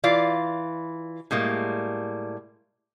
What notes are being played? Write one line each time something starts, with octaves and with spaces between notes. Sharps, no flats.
E3 F4 D5 F5
A2 G3 G#3 A#3